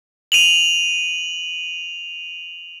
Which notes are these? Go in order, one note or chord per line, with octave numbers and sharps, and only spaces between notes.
D#7 F7 F#7